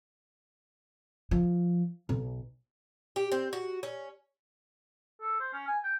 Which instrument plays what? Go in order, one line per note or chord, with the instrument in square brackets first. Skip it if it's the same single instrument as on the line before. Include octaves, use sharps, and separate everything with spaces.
[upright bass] F3
B1
[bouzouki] G4
C4
F#4
C#4
[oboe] A4
C5
C#4
G#5
G5